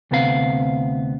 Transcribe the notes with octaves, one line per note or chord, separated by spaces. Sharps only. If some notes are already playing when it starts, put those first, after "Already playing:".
D2 C3 B3 C4 A4 F5